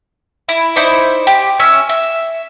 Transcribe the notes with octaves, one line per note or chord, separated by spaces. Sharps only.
E4
D#4 E4 C5 D5
G4
C#4 E5
E5